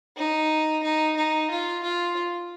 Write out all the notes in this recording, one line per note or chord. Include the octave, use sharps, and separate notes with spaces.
D#4
D#4
D#4
F4
F4